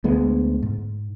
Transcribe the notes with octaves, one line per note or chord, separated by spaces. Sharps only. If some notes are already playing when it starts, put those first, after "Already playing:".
D2 G#3 B3
G#2